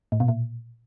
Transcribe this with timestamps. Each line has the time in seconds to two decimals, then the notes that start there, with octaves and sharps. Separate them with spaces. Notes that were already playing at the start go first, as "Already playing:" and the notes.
0.12 A2
0.20 B2
0.28 A#2